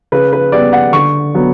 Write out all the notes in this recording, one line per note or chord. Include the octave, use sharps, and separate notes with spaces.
C#3 B4
B4
G3 B3 D5
F#5
D3 C#6
F#3 B3